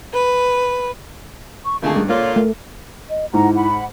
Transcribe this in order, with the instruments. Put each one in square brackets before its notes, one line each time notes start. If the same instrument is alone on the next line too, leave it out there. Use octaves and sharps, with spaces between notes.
[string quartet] B4
[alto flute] C#6
[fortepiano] G#1 D3 G#4 [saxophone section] A3 A#3 [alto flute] A5
[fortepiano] G2 [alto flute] G#4
[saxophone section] A#2 D3 F4 [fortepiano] A#3 [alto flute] C#5
[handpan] A3 [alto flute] A#4
[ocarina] D#5
[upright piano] G#2 [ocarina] E4 [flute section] F#5 A#5
[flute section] F#5 B5